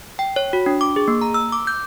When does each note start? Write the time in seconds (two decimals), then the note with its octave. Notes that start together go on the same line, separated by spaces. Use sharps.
0.19 G5
0.36 C#5
0.53 F#4
0.66 D4
0.81 D6
0.96 G#4
1.08 A#3
1.22 A#5
1.34 E6
1.52 D6
1.67 G6